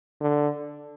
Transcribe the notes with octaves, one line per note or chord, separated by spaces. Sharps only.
D3